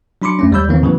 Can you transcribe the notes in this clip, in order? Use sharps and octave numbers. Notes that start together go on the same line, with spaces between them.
F#3 D4 B5 C6 D6 C#7
F#2 A3 C#4
D#2 G3 G#3 B5 E6 G6
D#2 D#3 E3 A#3 C4
A2 C#3 E3 F#3 B3